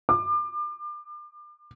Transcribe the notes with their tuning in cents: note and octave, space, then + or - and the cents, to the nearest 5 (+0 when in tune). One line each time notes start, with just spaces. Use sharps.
D6 +35